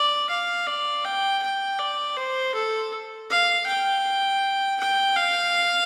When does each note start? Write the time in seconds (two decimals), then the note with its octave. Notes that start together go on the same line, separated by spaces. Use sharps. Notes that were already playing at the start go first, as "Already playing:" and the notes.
Already playing: D5
0.30 F5
0.67 D5
1.05 G5
1.42 G5
1.79 D5
2.17 C5
2.54 A4
3.30 F5
3.67 G5
4.80 G5
5.17 F5